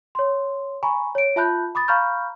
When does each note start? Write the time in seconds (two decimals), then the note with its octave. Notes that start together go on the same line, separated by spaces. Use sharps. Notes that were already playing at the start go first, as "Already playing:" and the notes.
0.15 C#5 C6
0.83 G#5 A#5 B5 C#6
1.15 C#5 D7
1.36 F4 E5 A5 B5 F#6 G6
1.75 B5 D6 D#6 A6
1.88 F5 A#5 B5 C#6 F6 G6